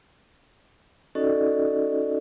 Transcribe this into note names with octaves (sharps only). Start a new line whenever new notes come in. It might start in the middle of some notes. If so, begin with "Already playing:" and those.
C#4 D#4 F#4 A4 D5 D#5